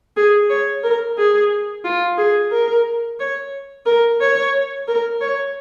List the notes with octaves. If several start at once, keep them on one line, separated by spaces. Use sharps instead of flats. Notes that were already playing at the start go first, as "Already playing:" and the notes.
G#4
C#5
A#4
G#4
F4
G#4
A#4
C#5
A#4
C#5
A#4
C#5